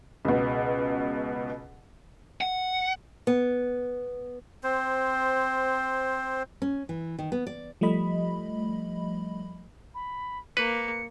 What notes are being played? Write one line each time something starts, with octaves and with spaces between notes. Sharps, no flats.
C#2 B2
F#5
B3
C4 C5
C#4
E3
D#3
B3
D5
F3 G3 A3 D#5 B5
B5
A#3 B4 C#7